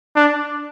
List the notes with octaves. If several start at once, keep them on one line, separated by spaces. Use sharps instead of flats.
D4